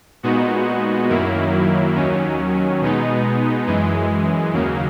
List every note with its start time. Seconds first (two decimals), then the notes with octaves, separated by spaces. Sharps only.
0.23 A#2 G#3 B3 D#4 F#4
1.09 F#2 D#3 F#3 A#3 E4
1.96 D#2 D#3 F#3 C#4
2.81 B2 G#3 B3 D#4
3.67 F#2 E3 G#3
4.53 D#2 C#3 F#3 A#3